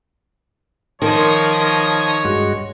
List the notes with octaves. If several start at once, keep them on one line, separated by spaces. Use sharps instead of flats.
D#3 F3 C#5 D#6 G#6 A#6
G2 G#3 F#4